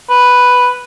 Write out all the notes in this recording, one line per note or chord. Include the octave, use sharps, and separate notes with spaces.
B4